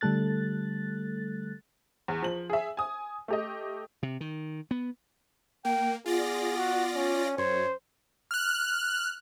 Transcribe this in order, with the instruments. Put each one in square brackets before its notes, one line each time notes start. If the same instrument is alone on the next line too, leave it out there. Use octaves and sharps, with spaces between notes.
[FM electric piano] D3 G3 A3 A4 F#6 A6
[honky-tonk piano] E2
F3 F#7
G#4 E5
G#5 D#6
A3 G4 D#5
[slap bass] C3
D#3
B3
[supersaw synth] A#3 [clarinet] G5
[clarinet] B3 [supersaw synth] F4 D5 A#6 [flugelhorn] G#4
[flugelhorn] F#4
C#4
[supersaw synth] F#2 [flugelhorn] C5 [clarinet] C#5
[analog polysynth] F6 F#6